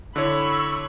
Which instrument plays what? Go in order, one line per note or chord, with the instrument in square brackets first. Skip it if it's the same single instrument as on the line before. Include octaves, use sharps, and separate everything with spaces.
[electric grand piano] D3 E4 C#5 [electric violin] B5 C#6 [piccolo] E6